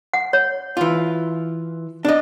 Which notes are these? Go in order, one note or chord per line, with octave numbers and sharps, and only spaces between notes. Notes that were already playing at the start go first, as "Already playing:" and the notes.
F#5
C#5
E3 F4
D4 D#5